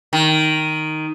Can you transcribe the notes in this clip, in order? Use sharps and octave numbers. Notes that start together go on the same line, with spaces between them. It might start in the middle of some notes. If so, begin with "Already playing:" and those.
D#3